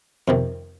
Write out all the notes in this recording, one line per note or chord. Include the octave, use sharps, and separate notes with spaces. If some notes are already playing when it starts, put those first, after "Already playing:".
F2 C3 D#3